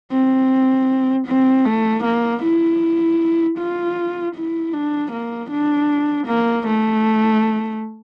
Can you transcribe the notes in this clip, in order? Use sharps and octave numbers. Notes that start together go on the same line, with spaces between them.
C4
C4
A3
A#3
E4
F4
E4
D4
A#3
D4
A#3
A3